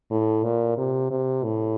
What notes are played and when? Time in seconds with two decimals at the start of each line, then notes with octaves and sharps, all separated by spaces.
0.11 A2
0.44 A#2
0.77 C3
1.11 C3
1.44 A2